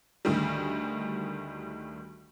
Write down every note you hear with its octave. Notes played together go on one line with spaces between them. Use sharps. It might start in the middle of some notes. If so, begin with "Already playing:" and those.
D2 D#3 G3